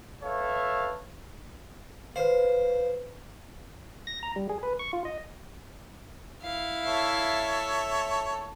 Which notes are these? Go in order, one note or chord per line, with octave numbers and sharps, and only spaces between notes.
A4 B4 C#5 E5 F5
B4 C5 F5
A#6
A#5
G3
G#4
B4
C#6
F4
D#5
E4 F5
A4 C#5 E5